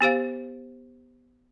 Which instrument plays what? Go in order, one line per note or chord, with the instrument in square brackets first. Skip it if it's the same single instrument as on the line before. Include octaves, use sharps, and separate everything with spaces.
[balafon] B3 G4 C5 F5